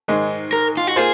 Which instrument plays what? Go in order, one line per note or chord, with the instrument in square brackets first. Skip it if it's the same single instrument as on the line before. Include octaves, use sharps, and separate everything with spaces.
[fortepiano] G#2 D#3 G#3
[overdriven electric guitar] A#4
F4
F#4
[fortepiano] A#3 F4 C5 [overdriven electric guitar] G#4